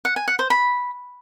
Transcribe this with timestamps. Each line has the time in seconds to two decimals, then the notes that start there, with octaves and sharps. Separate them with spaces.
0.05 F#5
0.16 G#5
0.28 F#5
0.39 C5
0.50 B5